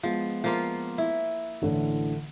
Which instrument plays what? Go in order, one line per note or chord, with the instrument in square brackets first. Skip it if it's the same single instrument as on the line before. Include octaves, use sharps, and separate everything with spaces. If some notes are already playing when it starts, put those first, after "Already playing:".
[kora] F3 [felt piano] G#3 B3
[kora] F3 A#3 F4
E4
[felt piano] A1 D3 E3